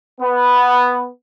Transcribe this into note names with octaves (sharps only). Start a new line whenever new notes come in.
B3